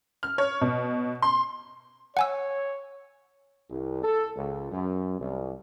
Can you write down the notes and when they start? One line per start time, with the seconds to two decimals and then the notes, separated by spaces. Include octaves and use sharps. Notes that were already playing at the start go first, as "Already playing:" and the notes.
0.23 F6
0.38 C#5
0.61 B2
1.22 C6
2.17 C#5 F#5 G#5 E6
3.70 C2
4.03 A4
4.36 C#2
4.71 F#2
5.19 C2